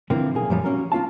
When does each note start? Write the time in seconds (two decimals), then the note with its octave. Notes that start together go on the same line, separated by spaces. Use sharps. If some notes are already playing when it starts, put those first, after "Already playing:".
0.10 D3 E3 F3 A#3 C4
0.34 B1 A#3 G#4
0.49 F#2 A#2 F3 G3
0.64 A#3 C#4 F#4 A#4
0.92 A#3 F4 F5 A5